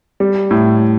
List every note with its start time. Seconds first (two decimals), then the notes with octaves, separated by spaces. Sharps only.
0.20 G3
0.51 A2